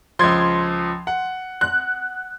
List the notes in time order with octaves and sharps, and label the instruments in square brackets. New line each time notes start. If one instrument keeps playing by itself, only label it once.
[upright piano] C#2 F3 [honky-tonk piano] C6 G#6
[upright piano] F#5
[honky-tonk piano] F#6